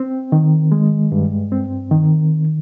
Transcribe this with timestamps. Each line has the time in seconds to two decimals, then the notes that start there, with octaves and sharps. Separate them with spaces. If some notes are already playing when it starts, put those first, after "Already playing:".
Already playing: C4
0.32 D#3
0.72 G#3
1.12 G2
1.52 C4
1.91 D#3